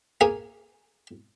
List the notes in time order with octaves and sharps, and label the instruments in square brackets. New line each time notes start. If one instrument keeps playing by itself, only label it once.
[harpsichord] A#3 G#4 G#5